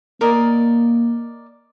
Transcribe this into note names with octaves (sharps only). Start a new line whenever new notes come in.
A#3 A#4 D5 D#5